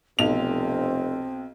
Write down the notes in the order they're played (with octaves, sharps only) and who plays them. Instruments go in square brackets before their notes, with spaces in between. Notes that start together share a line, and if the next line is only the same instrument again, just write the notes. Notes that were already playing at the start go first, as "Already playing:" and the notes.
[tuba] F1 [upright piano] B1 F7 [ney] C4